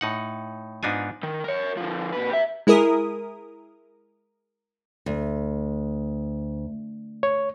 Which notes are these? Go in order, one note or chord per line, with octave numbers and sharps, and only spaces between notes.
A2 D#4 F#5
G#2 B3 D4 D#4 F4 G#5
D#3
A#4 C#5
D3 F3
A#2 B4
G4 E5
G#3 E4 G#4 A#4 D#6
D2
C#5